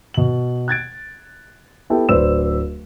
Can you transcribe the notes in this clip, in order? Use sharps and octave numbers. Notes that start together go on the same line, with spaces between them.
B2 F#7
F#6 G#6 A6 D7
B3 E4 G4 A4 E5 G5
D1 B4 C5 D5 E6 E7